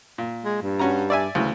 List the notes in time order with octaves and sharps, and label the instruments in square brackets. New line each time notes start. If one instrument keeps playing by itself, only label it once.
[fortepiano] A#2
[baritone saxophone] G#3
G2
[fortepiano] C#4 F#4 A#5
D5 E5 G#5
D2 C#3 E3